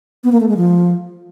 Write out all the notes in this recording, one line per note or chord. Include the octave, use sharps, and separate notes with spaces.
B3
A#3
A3
G#3
F3